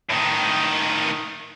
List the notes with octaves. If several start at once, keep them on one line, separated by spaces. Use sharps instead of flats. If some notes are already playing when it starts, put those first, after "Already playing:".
A2 D#3